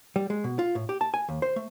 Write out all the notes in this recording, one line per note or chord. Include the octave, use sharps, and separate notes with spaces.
G3
G#3
B2
F4
A2
G4
A5
G#5
D#2
C5
A3